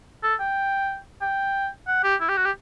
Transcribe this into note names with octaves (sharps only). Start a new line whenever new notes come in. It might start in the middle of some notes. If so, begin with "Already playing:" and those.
A4
G5
G5
F#5
G4
E4
G4
F#4
G4